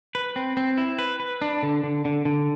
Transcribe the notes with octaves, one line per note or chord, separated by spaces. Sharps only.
B4
C4
C4
E4
B4
B4
D4
D3
D3
D3
D3